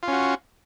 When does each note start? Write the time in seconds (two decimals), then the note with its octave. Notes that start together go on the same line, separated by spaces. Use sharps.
0.03 F4
0.08 C#4
0.13 F#4